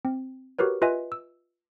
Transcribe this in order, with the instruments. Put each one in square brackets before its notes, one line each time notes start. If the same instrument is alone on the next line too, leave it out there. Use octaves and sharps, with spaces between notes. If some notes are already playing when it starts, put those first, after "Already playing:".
[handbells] C4
F#4 G4 A#4 B4 C#5
F4 B4 D#5 E5 G#5
E6